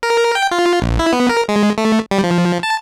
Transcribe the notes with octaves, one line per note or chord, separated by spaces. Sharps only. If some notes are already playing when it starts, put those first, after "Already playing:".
A#4
G5
F4
A#1
E4
B3
A#4
G#3
A3
G3
F3
A5